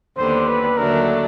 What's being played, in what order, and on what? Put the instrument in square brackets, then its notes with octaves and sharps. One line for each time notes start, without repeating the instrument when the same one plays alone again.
[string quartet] D#2 D3 G3 B3 [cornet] C5
[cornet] B4
[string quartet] D#2 D3 F#3 A3 D4 [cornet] A#4